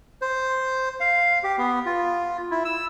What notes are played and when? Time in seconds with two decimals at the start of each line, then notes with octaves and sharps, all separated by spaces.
0.22 C5
1.00 F5
1.43 G4
1.58 B3
1.86 F4
2.51 E4
2.65 E6